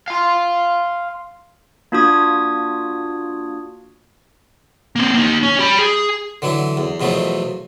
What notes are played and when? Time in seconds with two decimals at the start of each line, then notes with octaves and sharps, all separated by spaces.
0.08 F5 C6
1.92 A#3 D4 F4 F#4 D#6 G#6
4.96 A#3 C4
5.14 A#3 D#4
5.43 C#4
5.59 G4 B5
5.79 G#4
6.42 D3 E3 F#3 E4
6.77 E2
7.00 E2 B2 F3 F#3 A3